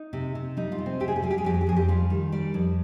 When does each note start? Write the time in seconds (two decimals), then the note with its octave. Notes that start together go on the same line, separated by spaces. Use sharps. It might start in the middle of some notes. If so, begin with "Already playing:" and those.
Already playing: D#4
0.13 C3
0.35 C3
0.57 G3 D#4
0.72 F4
0.78 C3
0.86 C4
1.00 C3 G4
1.08 G#4
1.16 G4
1.22 G3 G#4
1.31 G4
1.38 G#4
1.44 F2 G4
1.54 G#4
1.61 G4
1.67 F2 G#4
1.76 G4
1.88 G3 F4
2.10 D#3
2.32 G3 D5
2.54 F2